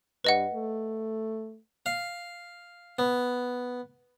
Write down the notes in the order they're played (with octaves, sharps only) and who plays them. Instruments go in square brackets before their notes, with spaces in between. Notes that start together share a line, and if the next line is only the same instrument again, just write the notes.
[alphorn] G2 [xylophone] B4 D#5 F#5
[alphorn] A3
[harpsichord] F5
B3